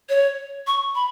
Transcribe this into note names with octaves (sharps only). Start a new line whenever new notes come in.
C#5
C#6
B5